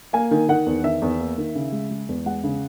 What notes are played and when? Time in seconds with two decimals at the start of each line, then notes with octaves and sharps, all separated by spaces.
0.13 A#3 G#5
0.31 D#3
0.49 D#3 F#5
0.66 E2
0.84 D#3 E5
1.02 E2
1.19 A#3
1.38 D#3
1.55 C#3
1.72 G#3
1.90 G#3
2.09 E2
2.26 G#3 F#5
2.44 C#3